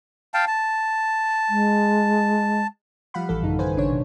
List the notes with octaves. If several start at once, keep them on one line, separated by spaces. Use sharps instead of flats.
F5 G5 A5
A5
G#3
F3 G3 F5 F#5 B5
A1 E3 A4
A#1 F#2 C#3 D#4
D#3 B4 C5 G#5
G#1 C#3 D4 C#5
B2